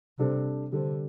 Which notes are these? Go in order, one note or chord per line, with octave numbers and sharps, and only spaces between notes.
C3 G3 D4 A4 C5
D3 G3 D4 A4 C5